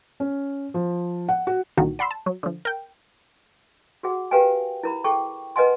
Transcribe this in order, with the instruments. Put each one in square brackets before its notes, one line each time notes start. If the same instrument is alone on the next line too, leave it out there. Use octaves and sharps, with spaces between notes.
[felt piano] C#4
F3
F#5
F#4
[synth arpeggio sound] C2 A#2 D3 D#3 F#4
D5 F#5 B5 C6 E6
A5
F#3
D3 F3
A#4 G5
[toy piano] F#4 G#4 F#5
G4 A#4 B4 F5 G5 G#5
E4 A#4 B5
G#4 A4 G5 C#6
A#4 B4 D#5 F#5 G#5 C6